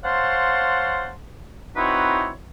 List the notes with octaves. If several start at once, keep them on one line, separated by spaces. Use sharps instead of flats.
C5 C#5 F5 F#5 A5 C6
C4 D#4 E4 F#4 B4 C#5